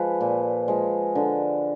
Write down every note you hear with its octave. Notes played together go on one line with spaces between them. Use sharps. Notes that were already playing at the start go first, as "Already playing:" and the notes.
Already playing: F3 G#3 B4
A#2
F3 G#3
D3